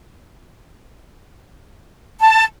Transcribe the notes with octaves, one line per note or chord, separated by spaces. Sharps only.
A5